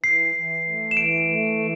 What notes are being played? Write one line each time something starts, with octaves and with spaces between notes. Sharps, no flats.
E3 C7
E3
A3
E7
E3 D7
A3
E3